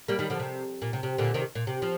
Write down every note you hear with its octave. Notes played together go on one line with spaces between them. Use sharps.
G3 A#3
D#3 G3
D3 F3
C3
A#2
C3
C3
A#2 D3
C3 D#3
A#2
C3
F3